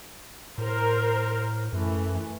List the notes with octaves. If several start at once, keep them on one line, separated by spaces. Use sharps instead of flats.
A2 A#4 C5
F#2 E3 A3